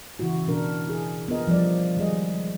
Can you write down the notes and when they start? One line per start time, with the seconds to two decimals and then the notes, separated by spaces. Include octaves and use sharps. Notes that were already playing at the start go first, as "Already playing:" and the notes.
0.19 C#3 E3 E4 F#4
0.48 B2 D4 A#4
0.87 E4 G#4
1.28 B3 F4 A#4 D#5
1.47 F3 G3 A#4 D5
1.97 D#3 G3 G#3 G#4 D#5